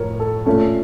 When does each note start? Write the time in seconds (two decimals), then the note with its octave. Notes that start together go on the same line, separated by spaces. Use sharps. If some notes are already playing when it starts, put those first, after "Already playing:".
Already playing: A2 F3 A#4 C#5
0.20 A4
0.46 A#2 A3 C#4 A4